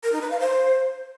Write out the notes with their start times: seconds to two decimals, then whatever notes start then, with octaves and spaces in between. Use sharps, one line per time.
0.03 A#4
0.12 D#4
0.21 B4
0.30 F5
0.40 C5